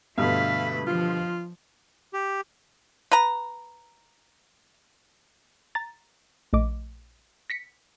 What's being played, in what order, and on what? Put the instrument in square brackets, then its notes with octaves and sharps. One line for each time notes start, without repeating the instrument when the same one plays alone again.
[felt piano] G2 B2 D3 [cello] A3 B4 [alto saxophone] F5
[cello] F3 [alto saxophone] F4
[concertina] G4
[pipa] B4 A#5
[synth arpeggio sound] A#5 A6
A#1 A3 D#5 D6
A#6 B6 C#7